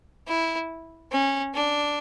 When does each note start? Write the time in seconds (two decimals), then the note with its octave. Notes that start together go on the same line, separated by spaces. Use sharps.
0.27 E4
1.12 C#4
1.54 D4